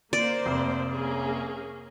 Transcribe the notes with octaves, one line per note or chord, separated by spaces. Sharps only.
A#3 C5 D5
F1
A#3 C#4 G#4